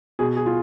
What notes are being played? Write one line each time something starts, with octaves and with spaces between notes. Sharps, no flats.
B2 G#4
G#4
F4